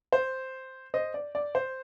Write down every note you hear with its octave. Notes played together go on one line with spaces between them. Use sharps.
C5
C5 D#5
D5
D5
C5